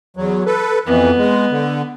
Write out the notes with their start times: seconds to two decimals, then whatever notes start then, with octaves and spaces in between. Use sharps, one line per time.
0.17 E2 F#3
0.46 A4 B4
0.87 F2 E3 B3
1.18 G#3
1.51 D3